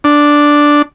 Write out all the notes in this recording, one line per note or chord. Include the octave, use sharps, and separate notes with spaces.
D4